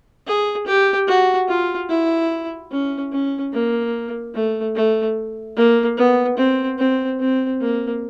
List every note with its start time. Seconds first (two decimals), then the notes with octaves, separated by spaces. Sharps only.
0.27 G#4
0.67 G4
1.08 F#4
1.48 F4
1.89 E4
2.71 C#4
3.12 C#4
3.53 A#3
4.34 A3
4.75 A3
5.56 A#3
5.97 B3
6.37 C4
6.78 C4
7.20 C4
7.61 A#3